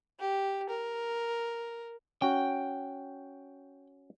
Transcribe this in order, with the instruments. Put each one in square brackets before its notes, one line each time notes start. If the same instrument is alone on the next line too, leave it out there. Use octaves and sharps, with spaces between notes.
[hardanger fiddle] G4
A#4
[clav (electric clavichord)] C#4 F#4 [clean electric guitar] G5